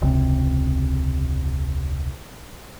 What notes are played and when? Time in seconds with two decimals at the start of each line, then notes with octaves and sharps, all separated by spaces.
0.01 E1 C#2 C3